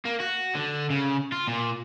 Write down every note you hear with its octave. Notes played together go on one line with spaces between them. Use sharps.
A#3
F#4
D3
C#3
F4
A#2